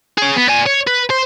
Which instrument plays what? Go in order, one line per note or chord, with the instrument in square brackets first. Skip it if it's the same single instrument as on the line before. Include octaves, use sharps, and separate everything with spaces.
[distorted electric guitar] G#4 C#5
B3
D5 G#5
C#5
B4
C5